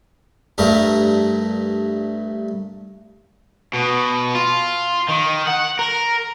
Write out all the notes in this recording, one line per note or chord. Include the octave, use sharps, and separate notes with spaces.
G2 A3 A#4
B2
F4
D#3
F#5
A#4